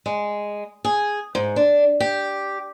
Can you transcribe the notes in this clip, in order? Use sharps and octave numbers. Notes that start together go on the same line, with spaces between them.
G#3
G#4
G#2
D4
G4